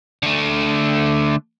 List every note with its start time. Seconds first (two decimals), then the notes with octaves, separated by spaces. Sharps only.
0.23 D3 A3